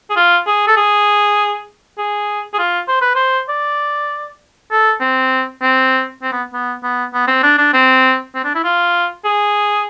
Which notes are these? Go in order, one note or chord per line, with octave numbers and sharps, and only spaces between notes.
G#4
F4
G#4
A4
G#4
G#4
G#4
F4
C5
B4
C5
D5
A4
C4
C4
C4
B3
B3
B3
B3
C4
D4
D4
C4
C4
D4
E4
F4
G#4